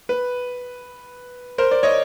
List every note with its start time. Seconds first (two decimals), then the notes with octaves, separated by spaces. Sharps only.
0.09 B4
1.58 A#4 C5
1.71 C5 D5
1.83 C#5 D#5